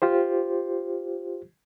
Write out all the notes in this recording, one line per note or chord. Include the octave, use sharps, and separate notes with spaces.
F4 G4 C5